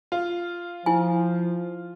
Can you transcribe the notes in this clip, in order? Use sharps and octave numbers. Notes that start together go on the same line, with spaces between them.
F4
F3 E4 G#5